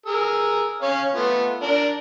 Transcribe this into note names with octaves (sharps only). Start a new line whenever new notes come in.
G#4 A#4 E6
C#4 C#5 F5
A3 B3 F4
D4 A#4